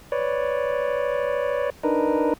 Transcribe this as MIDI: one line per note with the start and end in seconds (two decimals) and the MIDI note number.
0.12 1.70 71
0.12 1.70 73
0.12 1.70 74
1.83 2.33 62
1.83 2.33 63
1.83 2.33 70
1.83 2.33 71